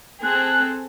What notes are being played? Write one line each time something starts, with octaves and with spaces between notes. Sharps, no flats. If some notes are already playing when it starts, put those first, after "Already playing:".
C4 G#4 A4 F#6